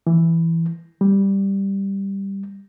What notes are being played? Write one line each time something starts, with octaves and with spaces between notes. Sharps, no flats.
E3
G3